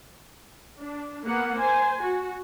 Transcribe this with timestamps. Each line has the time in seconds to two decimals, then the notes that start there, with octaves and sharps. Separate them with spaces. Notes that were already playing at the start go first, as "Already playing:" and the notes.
0.79 D4
1.23 A#3 B3 F#5
1.57 C5 G#5
2.01 F#4